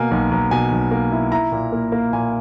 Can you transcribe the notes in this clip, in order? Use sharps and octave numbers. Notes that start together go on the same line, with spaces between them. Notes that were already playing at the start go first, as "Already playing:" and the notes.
Already playing: B2 A#3 G#5
B1
B1
B2 G#5
B1
A#3
E4
E4 A#5
A#2
A#3
A#3
A#2 G#5